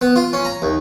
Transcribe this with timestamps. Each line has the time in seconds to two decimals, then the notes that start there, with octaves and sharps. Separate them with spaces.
0.01 B3
0.16 F4
0.33 C#4
0.45 A#5
0.62 D#2